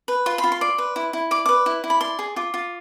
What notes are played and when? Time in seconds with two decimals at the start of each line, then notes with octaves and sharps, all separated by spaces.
0.08 B4
0.26 F4 C6
0.38 B5
0.44 F4
0.52 C6
0.61 D5
0.78 B4
0.96 E4
1.13 E4
1.31 D5 D6
1.46 B4 D6
1.66 E4
1.84 E4
1.90 B5
2.01 D5 C6
2.19 G#4
2.36 F4 D6
2.54 F4